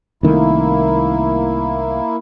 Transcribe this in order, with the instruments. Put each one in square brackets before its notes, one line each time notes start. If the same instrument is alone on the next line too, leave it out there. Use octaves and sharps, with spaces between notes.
[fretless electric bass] C2 D#3 A3 [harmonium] A#3 E4